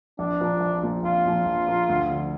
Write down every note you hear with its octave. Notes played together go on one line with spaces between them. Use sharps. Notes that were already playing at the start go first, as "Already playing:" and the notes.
A#1 D4
A#2 F3 A#3
A#1
A#2 F3 A#3
A#1 F4
A#2 F3 A#3
A#1
A#2 F3 A#3
D2
D3 F3